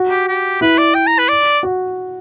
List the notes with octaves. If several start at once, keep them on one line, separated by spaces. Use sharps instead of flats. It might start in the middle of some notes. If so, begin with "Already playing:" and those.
Already playing: F#4
G4
G4
E4 B4
D5
G5
A#5
B4
D5
F#4